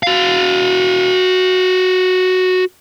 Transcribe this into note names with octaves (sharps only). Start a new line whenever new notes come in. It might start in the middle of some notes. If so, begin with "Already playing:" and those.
F#4 F5